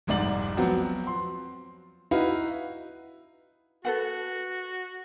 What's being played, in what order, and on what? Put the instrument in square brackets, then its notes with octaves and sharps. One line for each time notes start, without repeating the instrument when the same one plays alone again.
[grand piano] F1 C2 G#2 D5 F#7
F3 F#3 B3 C4 F#4
C6
D#4 E4 F#4 B4 F5
[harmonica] F#4 [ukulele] A4 B4 F#5